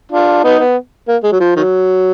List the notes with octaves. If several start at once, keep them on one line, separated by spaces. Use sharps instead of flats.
D4 F4
B3 D#4
B3
A#3
G#3
F#3
F3
D#3 F#3